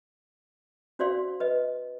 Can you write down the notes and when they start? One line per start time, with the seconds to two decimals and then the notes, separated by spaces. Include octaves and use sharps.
0.99 C#4 F#4 C5 D5 F5 C6
1.40 B4 D#5